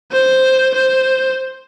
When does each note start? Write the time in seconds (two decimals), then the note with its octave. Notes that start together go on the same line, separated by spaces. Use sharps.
0.12 C5
0.74 C5